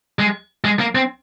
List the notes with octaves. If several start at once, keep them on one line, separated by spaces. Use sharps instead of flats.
G#3
G#3
A#3
C4